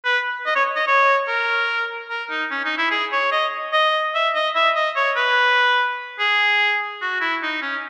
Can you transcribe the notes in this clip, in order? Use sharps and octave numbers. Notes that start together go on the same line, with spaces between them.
B4
D#5
C#5
D#5
C#5
A#4
A#4
D#4
C#4
D#4
E4
G#4
C#5
D#5
D#5
E5
D#5
E5
D#5
C#5
B4
G#4
F#4
E4
D#4
C#4